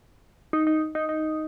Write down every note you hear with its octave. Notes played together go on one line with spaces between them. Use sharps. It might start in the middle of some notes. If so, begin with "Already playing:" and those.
D#4
D#4
D#4
D#4